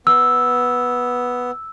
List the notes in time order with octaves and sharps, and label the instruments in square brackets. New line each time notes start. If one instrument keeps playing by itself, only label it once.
[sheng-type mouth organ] B3 [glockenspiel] E6